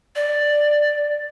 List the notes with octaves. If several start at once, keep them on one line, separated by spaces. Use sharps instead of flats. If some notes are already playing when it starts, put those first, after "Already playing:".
D5